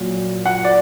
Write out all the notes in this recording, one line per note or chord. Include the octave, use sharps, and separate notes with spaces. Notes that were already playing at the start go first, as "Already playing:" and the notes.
Already playing: A#2 F#3
F#5
D5